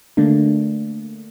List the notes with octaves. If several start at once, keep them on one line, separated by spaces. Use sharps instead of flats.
D3 A3 A#3 D4